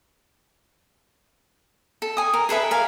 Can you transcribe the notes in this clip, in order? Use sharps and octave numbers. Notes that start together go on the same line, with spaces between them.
A4
G#5 D#6
A#4
G#4 A4 B4 E5
A#4 F5 G#5